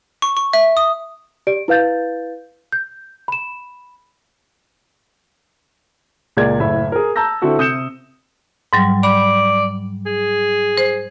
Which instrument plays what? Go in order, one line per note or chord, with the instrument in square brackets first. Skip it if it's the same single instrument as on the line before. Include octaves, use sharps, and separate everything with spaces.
[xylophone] C#6
C#6
E5
D#6
[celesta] G4 D5 D7
E4 B4 F5 G6 A6
G6
B5 E7
[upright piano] C#2 A#2 G#3 A#4 D5 G#6
F#1 A2 E5 B5
G#4 A#4
A5 A#5 E6 G6 A#6
D3 C4 E4 F#4 A4
C3 D#6 G6 C#7 E7
[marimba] G#2 F#3 G3
[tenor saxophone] D5 [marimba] B5
[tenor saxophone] G#4
[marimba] C5